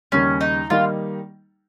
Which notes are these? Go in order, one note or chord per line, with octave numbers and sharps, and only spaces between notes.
D#2 C#3 G3 C#4
D#4
D#3 G3 A#3 D#4 F4